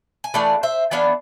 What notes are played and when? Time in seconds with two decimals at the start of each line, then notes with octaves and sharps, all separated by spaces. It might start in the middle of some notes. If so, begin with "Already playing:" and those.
0.24 G#5
0.34 E3 A3 D4 D5 F5
0.63 C5 E5
0.91 E3 B3 D4 D5 F5